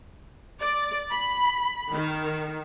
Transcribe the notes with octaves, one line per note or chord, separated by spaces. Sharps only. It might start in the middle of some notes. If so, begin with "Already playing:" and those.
D5
B5
D#3